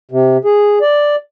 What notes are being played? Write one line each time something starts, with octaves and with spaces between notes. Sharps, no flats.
C3
G#4
D5